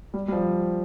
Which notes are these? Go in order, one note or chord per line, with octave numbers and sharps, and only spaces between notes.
G3
G3
F3